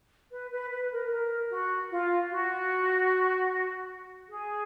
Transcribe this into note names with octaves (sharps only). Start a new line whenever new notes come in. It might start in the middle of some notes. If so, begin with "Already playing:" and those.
B4
B4
B4
A#4
A#4
F#4
F4
F#4
G#4